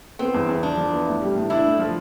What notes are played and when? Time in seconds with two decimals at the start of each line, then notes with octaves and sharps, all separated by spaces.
0.19 B3 C4
0.34 E2
0.49 E2
0.63 F3 D4
0.78 F3
0.93 B3
1.07 A2
1.22 G3
1.36 A2
1.50 D4 E4
1.65 A3
1.79 F3